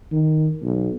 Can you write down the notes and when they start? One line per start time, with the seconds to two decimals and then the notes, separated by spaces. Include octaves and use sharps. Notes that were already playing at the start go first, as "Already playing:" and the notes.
0.12 D#3
0.63 B1